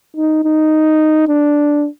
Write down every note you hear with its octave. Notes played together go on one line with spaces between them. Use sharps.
D#4
D#4
D4